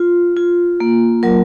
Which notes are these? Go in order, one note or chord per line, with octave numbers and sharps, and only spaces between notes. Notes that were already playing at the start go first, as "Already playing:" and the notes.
Already playing: F4
F4
A#3
F#3 A#4